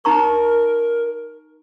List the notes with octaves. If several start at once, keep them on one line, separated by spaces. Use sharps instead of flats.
D#4 A#4 A#5 C#6